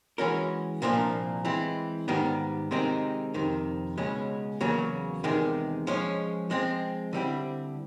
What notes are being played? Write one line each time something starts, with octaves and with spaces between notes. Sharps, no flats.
E3 G#3 C#4 F#4 A#4
C2 A#2 F3 A#3 D4
E3 G#3 C4
G#2 D#3 G3 B3
C3 D#3 G#3 C4 D#4
F2 C3 D#3
C#2 B2 G#3 C#4
E2 C#3 F#3 A#3
E2 C3 D#3 G#3
F3 G#3 C#4
F3 G#3 C4
D3 G3 C4 E4